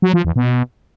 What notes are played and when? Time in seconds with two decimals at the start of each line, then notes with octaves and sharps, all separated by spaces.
0.02 F#3
0.13 F3
0.25 E2
0.36 B2